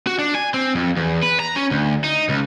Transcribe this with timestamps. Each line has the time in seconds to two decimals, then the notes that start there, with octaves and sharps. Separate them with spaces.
0.07 F#4
0.19 D4
0.35 G#5
0.54 C4
0.75 F2
0.96 E2
1.22 B4
1.40 A#5
1.56 C#4
1.71 D2
2.04 D#4
2.29 C#2